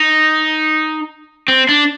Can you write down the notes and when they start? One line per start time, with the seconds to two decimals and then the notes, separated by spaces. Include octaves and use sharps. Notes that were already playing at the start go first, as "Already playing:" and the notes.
Already playing: D#4
1.48 C4
1.69 D4